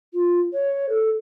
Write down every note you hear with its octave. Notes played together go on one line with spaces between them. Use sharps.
F4
C#5
A4